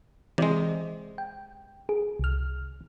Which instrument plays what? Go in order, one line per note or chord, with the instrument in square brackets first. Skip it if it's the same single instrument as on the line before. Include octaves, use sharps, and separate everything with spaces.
[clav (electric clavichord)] C3 G#3 [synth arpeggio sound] E3 G4 D5
[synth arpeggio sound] G5
G#4
C2 F6